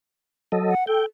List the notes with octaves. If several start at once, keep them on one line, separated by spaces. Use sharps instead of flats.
F#3 A4 D#5
F#5
A4 G5